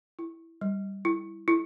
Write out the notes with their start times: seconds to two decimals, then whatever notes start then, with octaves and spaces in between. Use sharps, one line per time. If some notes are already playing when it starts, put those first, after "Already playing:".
0.19 E4
0.61 G3
1.05 E4
1.48 E4